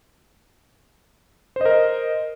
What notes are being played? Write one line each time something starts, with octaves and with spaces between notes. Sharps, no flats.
A#4 C5 D#5